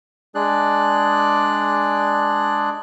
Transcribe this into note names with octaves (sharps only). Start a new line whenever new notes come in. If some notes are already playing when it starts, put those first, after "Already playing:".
G#3 D4 G#4 D5 F#6